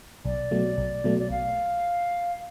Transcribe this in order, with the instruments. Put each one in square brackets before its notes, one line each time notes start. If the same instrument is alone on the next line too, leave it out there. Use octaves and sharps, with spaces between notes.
[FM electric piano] B1 [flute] D5
[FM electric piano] B2 F#3 A3
B1
B2 F#3 A3
[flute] D5
[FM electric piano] B1 [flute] F5